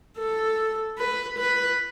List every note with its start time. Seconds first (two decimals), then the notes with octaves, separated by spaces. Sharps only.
0.18 A4
0.98 B4
1.38 B4